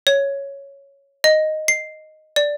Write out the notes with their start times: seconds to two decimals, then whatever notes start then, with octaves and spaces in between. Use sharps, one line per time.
0.07 C#5
1.24 D#5
1.68 C7
2.36 D5